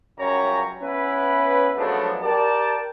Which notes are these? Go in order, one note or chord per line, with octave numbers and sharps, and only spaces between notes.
C#2 F#2 G3 C#5 A#5
B3 C#4 E4 B4
F3 F#3 G#3 A3 B3 D4
G4 A#4 D5 G5 A5